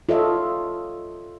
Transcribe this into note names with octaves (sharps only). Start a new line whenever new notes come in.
F4 A4 C#5 D#5 E5